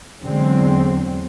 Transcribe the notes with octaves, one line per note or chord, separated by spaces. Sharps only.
E2 D3 F#3 G#3 C4